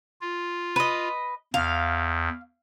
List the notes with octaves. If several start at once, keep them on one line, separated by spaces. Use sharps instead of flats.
F4
B4 D#5
E2 F5